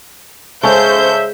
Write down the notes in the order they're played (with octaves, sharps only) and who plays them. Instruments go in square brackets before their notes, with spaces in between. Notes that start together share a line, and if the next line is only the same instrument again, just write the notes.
[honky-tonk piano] C#3 A4 C#5 [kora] G#3 C#4 [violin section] C5 G6 [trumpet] E5